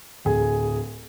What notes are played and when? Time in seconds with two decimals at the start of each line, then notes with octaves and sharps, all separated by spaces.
0.25 D1 G#4